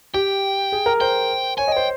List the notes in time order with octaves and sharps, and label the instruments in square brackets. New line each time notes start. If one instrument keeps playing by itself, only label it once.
[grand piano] G4 [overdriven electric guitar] G5
[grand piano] G#4
A#4
[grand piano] C5 [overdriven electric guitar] G5
[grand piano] C#5 [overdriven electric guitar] G#5
[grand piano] D#5
[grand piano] C5 [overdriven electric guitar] G5